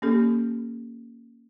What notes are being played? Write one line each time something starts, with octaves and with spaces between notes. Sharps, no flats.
A#3 C#4 G4 A4